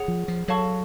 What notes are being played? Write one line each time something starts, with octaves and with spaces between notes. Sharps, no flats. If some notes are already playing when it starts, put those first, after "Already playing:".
Already playing: G#4 C#5 F#5
F3
F3
F#3 A4 C#5 F5 A5 C#6